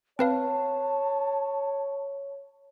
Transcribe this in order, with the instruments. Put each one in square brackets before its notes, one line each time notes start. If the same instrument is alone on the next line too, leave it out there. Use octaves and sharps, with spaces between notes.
[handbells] C4 B4 F5 [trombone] C#5 [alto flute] A5